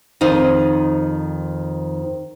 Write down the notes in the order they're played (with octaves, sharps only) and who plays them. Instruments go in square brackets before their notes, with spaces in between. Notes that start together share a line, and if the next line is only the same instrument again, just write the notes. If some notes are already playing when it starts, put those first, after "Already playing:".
[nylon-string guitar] F2 D#3 D#4 C5